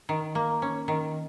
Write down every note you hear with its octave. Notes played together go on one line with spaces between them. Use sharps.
D#3
A#3
C#4
D#3